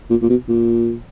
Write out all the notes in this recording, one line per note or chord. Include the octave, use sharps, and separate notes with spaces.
A#2
A#2
B2
A#2